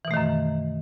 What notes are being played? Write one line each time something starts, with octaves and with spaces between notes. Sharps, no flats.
F#2 B2 D#3 E3 A3